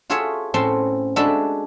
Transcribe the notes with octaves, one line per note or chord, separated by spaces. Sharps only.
F4 F#4 G#4 A4 C#5 E5
A2 C4 C#4 A4 A5 C6
G#3 D4 F#4 A4 E5 B5